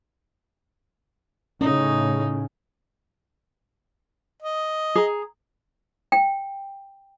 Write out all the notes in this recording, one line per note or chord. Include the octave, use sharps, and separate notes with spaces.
A2 C#3 C#4 D#4
D#5
G#4 A#5
G5